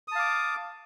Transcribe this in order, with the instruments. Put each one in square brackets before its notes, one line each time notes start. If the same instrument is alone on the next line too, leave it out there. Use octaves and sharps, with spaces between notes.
[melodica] D#6
A5
F5
D6